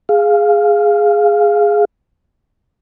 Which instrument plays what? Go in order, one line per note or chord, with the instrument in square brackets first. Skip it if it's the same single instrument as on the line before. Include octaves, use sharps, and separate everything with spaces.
[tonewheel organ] G#4 F5